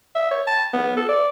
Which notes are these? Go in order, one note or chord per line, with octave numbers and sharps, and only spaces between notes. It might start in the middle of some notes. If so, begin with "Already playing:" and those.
E5
C#5
A5
B3
A4
D5